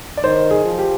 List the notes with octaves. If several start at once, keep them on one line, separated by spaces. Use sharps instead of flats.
D5
D#3 C5
G#4
F3
G4